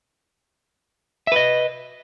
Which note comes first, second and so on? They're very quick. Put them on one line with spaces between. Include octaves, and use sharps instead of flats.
E5 B4 D#5